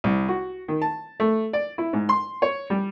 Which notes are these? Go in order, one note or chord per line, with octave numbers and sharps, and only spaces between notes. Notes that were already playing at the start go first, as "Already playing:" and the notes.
C2
F#4
D#3
A5
A3
D5
E4
G#2
C6
C#5
G3